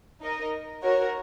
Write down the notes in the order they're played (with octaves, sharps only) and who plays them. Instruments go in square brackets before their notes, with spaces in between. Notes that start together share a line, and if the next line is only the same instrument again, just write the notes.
[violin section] D#4 A#4 D#5
F#4 A#4 C#5